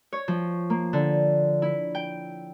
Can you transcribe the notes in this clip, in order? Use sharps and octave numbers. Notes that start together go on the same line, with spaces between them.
C#5
F3
A#3
D3
E4
G5